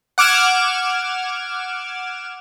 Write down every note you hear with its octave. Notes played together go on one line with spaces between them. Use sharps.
F#5 D6 F6 G#6 E7